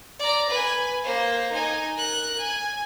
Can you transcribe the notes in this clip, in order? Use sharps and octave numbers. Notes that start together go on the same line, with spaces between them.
D5 A#5
B4 G#5
A#3 C5
D#4 G#5
A#4 F#6
G#5